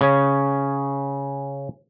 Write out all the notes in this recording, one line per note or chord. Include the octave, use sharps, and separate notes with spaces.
C#3 C#4